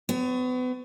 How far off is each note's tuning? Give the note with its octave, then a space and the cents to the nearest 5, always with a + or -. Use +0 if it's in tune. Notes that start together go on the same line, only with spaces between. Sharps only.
B3 +35 C#5 +0